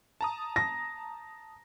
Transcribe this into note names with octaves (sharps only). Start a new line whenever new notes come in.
A5 A#5 D#6
A#6